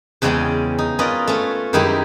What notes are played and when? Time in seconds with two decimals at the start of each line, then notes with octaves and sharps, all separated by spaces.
0.22 E2 C#3 G#3 C#4 D5 G5
0.79 D#4
0.99 C#4 F4 A#4 B4 D5 D#5
1.27 A3 C#4
1.73 F#2 D#3 G#3 D#4 E4 G4